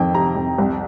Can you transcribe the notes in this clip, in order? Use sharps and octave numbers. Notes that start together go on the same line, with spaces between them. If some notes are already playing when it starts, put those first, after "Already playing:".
Already playing: F2 D#3 G5
C3 A#5
F2
C2